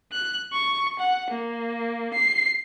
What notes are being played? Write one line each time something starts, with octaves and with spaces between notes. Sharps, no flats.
F#6
C#6
F#5
A#3
C7